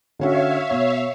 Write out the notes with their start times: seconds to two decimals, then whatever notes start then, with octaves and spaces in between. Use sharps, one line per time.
0.19 D3 C#4 F#4 C#5 E5 F5
0.71 B2